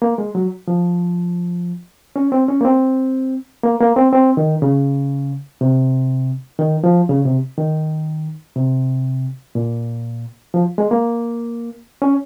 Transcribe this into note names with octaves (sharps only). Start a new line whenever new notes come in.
A#3
G#3
F#3
F3
C#4
C4
C#4
A#3
C4
A#3
A#3
C4
C4
D#3
C#3
C3
D#3
F3
C#3
C3
D#3
C3
A#2
F3
G#3
A#3
C#4